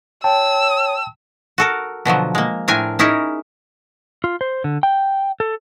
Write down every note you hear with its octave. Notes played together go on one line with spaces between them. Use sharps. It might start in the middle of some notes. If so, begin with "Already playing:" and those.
C#5 G5 A5 E6
F#4 A4 A#4
B2 D3 F3 F#3
G#3 A#3
A2 C4 D4 A#4 G#5
C#4 D#4 E4 G#4 A#4
F4
C5
D3
G5
A4